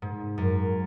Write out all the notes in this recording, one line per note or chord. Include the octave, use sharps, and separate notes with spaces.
G#2
F#2